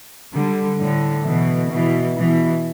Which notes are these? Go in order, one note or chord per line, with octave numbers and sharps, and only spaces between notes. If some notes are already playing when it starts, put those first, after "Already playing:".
D3 G3
A2 D3
B2 E3
B2 E3
B2 E3